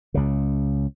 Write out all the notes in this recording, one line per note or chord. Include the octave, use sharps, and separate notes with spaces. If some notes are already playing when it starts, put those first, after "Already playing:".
C#2 C#3